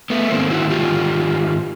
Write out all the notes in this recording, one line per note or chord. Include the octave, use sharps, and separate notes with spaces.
A3 B3
G#2 D#3 A#3 C4
E4 F#4
F4 G4